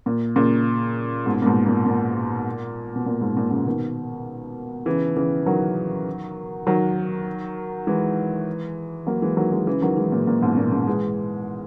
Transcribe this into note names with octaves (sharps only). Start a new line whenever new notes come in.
A#2
A#2 C#3
G#2 B2
A#2
G#2 B2
A#2
A#2
B2
A#2
G#2
A#2
A#2 C#3
B2 D#3
C#3 E3
C#3 E3
D#3 F#3
D#3 F#3
E3 G#3
F#3 A#3
E3 G#3
D#3 F#3
E3 G#3
C#3 E3
D#3 F#3
E3 G#3
A#2
A#2
G#2 B2
A#2
A#2 C#3
E3 G#3